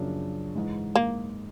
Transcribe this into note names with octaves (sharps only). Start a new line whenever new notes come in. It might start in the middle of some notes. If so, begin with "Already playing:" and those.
Already playing: F#2 C#3 F3 A#3 D4
G#2 E3 G#3
A#3